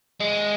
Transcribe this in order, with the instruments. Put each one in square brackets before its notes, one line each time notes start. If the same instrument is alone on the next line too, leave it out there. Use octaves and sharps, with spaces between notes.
[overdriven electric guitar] G#3